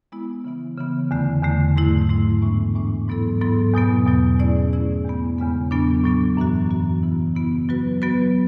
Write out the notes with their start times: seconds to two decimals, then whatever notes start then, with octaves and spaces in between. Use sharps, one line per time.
0.12 G#3 B3 E4
0.44 C#3 E3 B3
0.78 C#3 E3 B3
1.11 E2 D3 A3
1.43 E2 D3 A3
1.76 G#2 F#3 A3 E4
2.09 G#2 F#3 A3 E4
2.42 A2 E3 G#3 B3 D4
2.75 A2 E3 G#3 B3 D4
3.07 G#2 F#3 B3 E4 A4
3.41 G#2 F#3 B3 E4 A4
3.74 E2 B2 F#3 B3
4.07 E2 B2 F#3 B3
4.39 A3 C#4 E4 G#4 D5
4.73 A3 C#4 E4 G#4 D5
5.05 E2 C#3 G#3 B3
5.38 E2 C#3 G#3 B3
5.71 A2 F#3 B3 D4
6.04 A2 F#3 B3 D4
6.37 F#2 E3 B3 F#4
6.70 F#2 E3 B3 F#4
7.03 C#3 E3 B3 E4
7.35 C#3 E3 B3 E4
7.69 F#3 B3 F#4 B4
8.02 F#3 B3 F#4 B4